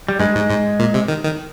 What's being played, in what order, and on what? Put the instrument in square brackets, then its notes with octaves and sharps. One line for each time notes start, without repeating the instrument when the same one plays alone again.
[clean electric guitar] G3
[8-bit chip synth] G2 [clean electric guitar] G#3
[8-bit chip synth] G#2
G#2
A#2
C3
D#3
D#3